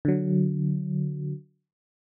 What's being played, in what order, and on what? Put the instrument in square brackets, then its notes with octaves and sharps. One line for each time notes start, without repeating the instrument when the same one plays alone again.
[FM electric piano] D3 F#3